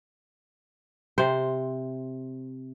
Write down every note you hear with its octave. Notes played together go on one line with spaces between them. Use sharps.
C3 C5